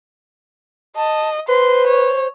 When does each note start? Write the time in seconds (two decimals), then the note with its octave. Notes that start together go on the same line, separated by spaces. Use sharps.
0.96 D#5 A5
1.49 B4 C5 C6
1.87 C#5